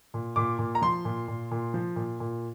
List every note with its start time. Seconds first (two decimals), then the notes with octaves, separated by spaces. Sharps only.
0.14 A#2
0.36 A#2 D6
0.59 A#2
0.75 A#5
0.82 F3 C6
1.05 A#2
1.28 A#2
1.51 A#2
1.74 F3
1.96 A#2
2.20 A#2